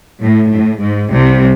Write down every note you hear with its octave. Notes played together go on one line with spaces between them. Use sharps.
A2
A2
G#2
C2 C3